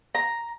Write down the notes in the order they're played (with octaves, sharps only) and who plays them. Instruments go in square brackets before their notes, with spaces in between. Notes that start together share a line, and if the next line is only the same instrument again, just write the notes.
[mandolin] A#5